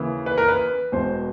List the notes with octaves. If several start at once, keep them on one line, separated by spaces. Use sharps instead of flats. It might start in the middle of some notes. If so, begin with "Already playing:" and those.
Already playing: D#2 C#3 E3
B4
A#4
B4
E1 E2 B2 C5